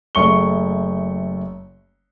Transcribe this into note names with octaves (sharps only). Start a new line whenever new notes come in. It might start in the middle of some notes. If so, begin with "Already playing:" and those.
F#1 A3 C#6 C#7 G7